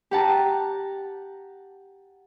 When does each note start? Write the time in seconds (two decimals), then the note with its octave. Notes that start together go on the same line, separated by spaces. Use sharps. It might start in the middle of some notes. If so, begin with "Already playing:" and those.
0.11 G4 F#5 A5 A#5